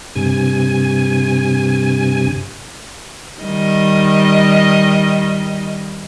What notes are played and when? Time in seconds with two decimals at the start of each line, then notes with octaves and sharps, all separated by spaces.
0.15 G2 C3 G#5
3.40 D#3 G3 D#5